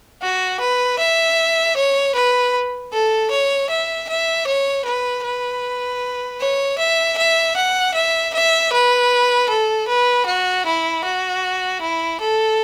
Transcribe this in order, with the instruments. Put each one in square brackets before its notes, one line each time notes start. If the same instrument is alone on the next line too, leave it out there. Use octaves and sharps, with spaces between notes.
[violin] F#4
B4
E5
C#5
B4
A4
C#5
E5
E5
C#5
B4
B4
C#5
E5
E5
F#5
E5
E5
B4
A4
B4
F#4
E4
F#4
E4
A4